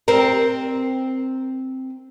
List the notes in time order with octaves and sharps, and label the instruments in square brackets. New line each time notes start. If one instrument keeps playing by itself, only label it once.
[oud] C4 A#4